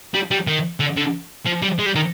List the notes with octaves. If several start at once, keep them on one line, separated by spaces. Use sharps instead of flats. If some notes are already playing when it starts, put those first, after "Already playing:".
G3
G3
D#3
D3
D3
F3
G3
G#3
G3
D#3